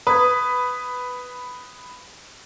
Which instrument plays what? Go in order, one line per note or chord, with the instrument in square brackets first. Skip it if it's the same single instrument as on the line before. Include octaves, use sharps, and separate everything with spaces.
[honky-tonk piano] B4 [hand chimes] D#6 G#6